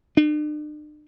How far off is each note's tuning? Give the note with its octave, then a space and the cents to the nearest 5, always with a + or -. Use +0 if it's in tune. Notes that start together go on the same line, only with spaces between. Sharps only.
D4 +45